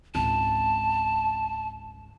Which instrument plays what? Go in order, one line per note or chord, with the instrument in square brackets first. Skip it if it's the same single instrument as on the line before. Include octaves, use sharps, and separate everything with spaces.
[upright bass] G#1 C#2 [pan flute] A5